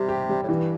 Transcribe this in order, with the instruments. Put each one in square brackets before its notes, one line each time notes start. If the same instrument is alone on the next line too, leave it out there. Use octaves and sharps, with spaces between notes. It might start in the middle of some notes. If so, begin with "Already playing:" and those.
Already playing: [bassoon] C3 [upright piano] G3
[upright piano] G4
G3
[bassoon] A2
[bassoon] G2 [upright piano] E3